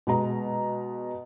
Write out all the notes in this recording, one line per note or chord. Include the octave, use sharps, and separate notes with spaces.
B2 G#3 A#5